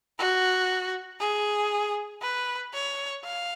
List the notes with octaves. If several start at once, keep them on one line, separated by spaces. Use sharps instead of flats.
F#4
G#4
B4
C#5
F5